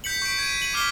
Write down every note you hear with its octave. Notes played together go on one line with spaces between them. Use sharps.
G6 B6 C#7 F#7
C#6 G6 B6 C#7 D7
G#6 D7 D#7
D#7 F#7
C#6 D6 F6 B6 C7 G7